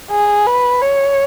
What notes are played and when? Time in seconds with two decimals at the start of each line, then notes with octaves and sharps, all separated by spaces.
0.11 G#4
0.46 B4
0.81 C#5